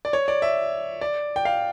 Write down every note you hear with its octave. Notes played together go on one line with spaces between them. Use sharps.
D5
C#5
D5
E5
D5
G5
F5